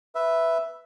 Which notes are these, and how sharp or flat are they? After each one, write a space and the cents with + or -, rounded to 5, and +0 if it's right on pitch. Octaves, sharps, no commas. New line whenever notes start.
B4 +0 E5 +0